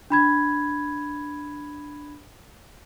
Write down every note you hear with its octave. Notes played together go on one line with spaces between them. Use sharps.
D4 B5 G#6